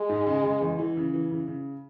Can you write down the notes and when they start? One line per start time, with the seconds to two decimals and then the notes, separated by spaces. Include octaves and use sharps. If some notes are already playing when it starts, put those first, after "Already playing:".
Already playing: G#3
0.09 G#2
0.27 C#3
0.44 C#3
0.61 E2
0.79 E3
0.97 C#3
1.13 E3
1.31 C#3
1.48 C#3